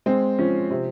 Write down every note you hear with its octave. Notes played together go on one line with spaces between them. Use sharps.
G#3 C4
F3 C#4
C3 C4